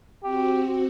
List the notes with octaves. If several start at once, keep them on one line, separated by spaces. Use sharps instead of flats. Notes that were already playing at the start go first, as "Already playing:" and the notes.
C4 F#4 G4